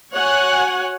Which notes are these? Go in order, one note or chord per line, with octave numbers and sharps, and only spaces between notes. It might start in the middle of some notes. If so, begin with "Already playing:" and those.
F#4 C#5 F#5 G#5